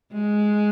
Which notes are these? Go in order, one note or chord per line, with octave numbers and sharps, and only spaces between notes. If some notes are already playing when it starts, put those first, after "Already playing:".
G#3